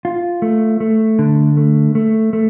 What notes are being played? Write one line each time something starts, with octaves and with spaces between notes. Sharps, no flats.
F4
A3
A3
D3
A3
A3
A3